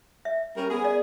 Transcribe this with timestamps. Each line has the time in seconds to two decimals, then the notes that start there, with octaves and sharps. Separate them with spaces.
0.25 E5
0.56 G3 C#4 A#4
0.70 B3 G#4
0.84 D5